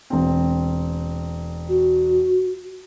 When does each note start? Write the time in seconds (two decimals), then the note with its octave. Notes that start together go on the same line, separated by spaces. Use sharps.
0.10 E1 C4
1.69 F#4